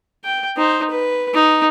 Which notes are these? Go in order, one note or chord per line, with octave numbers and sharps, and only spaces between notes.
G5
D#4 C5
B4
D#4